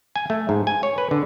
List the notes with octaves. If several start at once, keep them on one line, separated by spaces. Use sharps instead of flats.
G#5
A3
G#2
G#5
C#5
B4
D3